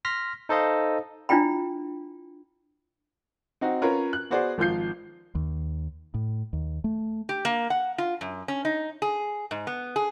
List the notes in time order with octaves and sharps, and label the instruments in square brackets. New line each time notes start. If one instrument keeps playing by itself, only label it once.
[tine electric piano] C6 F6 A#6 B6
D#4 A4 C5 D#5 F5
[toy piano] D4 E4 F4 G5 B5
[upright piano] C4 D#4 F#4
C#4 F4 A#4 B4 C#5
F#6
B3 F#4 G#4 C5 D5
G#1 F3 F4 G6 C7
[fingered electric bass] D#2
A2
D#2
A3
[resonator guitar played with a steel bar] G4
A#3
F#5
F4
F#2
C#4
D#4
G#4
G#2
B3
G#4